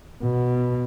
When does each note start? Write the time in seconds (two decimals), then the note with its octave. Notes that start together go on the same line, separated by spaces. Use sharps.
0.23 B2